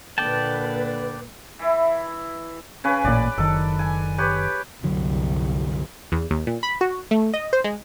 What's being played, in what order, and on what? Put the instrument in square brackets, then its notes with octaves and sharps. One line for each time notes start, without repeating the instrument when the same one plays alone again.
[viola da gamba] A#2 A#3 [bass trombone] D3 [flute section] B4 [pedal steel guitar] D5 G5 A5
[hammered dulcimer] E3 E4
C#3 C#4 B4
[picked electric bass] A1 A#2 [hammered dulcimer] D5
[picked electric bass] F#1 D#3 [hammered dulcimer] A4
[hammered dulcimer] G#5
G4 B4 C#5
[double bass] C2 [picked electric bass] F#2 D3 F#3
[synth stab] E2
D#2
A#2
B5
F#4
A3
D#5
C5
G#3